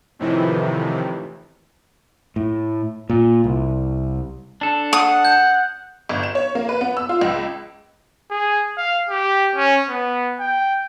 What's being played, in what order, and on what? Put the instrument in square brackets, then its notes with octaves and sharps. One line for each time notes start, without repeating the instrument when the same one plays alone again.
[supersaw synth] F2 A2 C3 D#3 E3
[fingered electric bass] A2
A#2
C2
[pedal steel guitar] D4 A4
[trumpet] F#5 [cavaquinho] D#6
[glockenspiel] G6
[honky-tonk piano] G1
E7
C#5
A#3
B4
B3
E6
F4
C#2
[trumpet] G#4
F5
G4
C#4
B3
G5